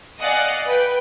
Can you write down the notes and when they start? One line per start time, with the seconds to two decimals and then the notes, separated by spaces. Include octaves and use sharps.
0.19 D5 D#5 F5 F#5 G#5 D#6
0.66 B4 G5